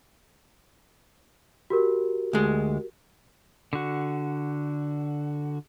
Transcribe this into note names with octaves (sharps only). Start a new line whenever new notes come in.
F#4 G4 A#4
D2 G#3
D3 F#4